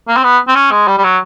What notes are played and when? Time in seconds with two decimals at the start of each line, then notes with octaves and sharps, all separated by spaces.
0.08 A#3
0.16 C4
0.24 B3
0.48 C4
0.55 C#4
0.71 G#3
0.87 G3
0.98 G3
1.04 F#3